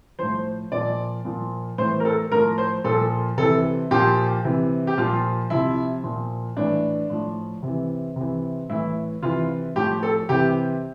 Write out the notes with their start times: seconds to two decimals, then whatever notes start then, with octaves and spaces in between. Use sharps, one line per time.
0.19 A2 F3 C5
0.72 A#2 F3 D5
1.25 A#2 F3
1.78 A2 E3 C5
2.00 A#4
2.05 A4
2.31 A2 F3 A#4
2.58 C5
2.84 A#2 F3 A4
3.38 C3 E3 A4
3.91 A#2 F3 G4
4.45 C3 E3
4.87 G4
4.98 A#2 F3 F4
5.50 C3 F3 E4
6.04 A#2 F3
6.57 A2 E3 D4
7.10 A2 F3
7.63 C3 E3
8.16 C3 E3
8.69 A2 E3 E4
9.23 C3 E3 F4
9.76 A2 F3 G4
10.03 A4
10.29 C3 E3 G4